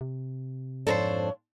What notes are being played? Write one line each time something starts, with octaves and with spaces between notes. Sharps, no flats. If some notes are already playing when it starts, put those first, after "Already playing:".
C3
F2 G#2 D4 A4 A#4 C5 C#5